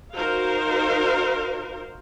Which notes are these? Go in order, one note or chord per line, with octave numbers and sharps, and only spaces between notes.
D#4 F#4 A#4 C5 F5